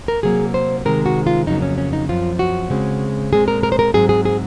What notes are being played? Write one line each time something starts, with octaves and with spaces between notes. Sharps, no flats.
A#4
C3 F#3 A#3 G#4
C5
C3 D#3 G#3 C4 A#4
F#4
F4
F2 C#3 F#3 A#3 D#4
C#4
C#4
D#4
F#2 F3 C4 F4
F#4
C#3 G#3 C4
A#2 G#3 C4 G#4
A#4
A#4
C5
A#4
G#2 F#3 C4 G#4
G#4
G#4